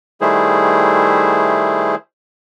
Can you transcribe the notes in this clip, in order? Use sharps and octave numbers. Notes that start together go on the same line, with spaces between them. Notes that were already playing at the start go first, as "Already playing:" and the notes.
D#3 G3 A3 E4 G#4 C5